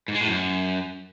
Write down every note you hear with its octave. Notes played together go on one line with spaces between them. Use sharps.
G#2
G#3
A2
F#2